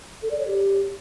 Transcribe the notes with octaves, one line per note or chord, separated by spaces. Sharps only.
A4
D5
C#5
G4